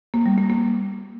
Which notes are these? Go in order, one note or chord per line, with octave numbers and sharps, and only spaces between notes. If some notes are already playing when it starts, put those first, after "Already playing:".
A#3
G3
A#3
A#3